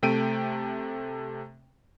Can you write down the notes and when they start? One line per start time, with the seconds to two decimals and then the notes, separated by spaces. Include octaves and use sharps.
0.03 C3 A3 G5 D7 D#7